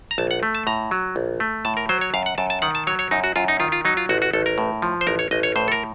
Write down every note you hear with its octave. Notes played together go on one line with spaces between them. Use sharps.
A#5
A#1 A5
F#5
A3
A5
A2 A#5
F#3
A#1
A3
A2 A5
A#4
F#3 C5
C#5
F#2 F5
F#5
F#2 A5
A5
D#3 F#5
A5
F#3 C#5
C#5
F#2 D#4
F#4
F#2 F4
D#4
D#3 F4
F4
F#3 D#4
F4
A1 F#4
F#4
A1 A4
A#4
A2
F3
C5
A1 A#4
C#5
A1 D#5
C#5
A2 C5
A4
A#4